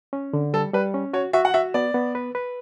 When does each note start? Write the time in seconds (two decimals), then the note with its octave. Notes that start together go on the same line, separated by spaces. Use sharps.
0.13 C#4
0.33 D3
0.54 G3 A4
0.73 G3 B4
0.94 C#4
1.13 F#4 C#5
1.33 F#4 E5
1.45 F#5
1.54 F#4 E5
1.74 B3 D5
1.94 B3
2.15 B4
2.35 B4